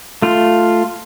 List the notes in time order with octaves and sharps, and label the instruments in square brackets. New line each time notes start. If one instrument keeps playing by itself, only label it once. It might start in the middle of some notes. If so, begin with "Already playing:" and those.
[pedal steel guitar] A3 F4